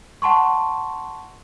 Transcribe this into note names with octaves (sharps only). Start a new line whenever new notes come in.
F#5 A5 C6 C#6